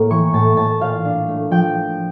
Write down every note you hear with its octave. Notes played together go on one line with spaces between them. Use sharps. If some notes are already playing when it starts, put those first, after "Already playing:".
Already playing: A2 A#3
E3 C#6
A2 A5
A2 A5
A#2 F5
D4
A3
F3 G5